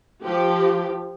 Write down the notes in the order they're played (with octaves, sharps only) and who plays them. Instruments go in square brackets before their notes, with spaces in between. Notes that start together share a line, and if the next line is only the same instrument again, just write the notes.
[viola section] F3 G4